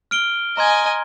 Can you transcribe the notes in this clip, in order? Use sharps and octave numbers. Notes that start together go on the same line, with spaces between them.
F6 D7 G7
D#5 G#5 A#5 C6 G#6